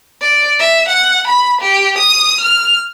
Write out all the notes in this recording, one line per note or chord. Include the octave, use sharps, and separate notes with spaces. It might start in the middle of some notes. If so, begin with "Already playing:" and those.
D5
E5
F#5
B5
G4
D#6
F6